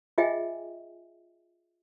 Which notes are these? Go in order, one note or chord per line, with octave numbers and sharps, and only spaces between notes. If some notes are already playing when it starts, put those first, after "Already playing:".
F4 G#4 D#5 E5 G5 G#5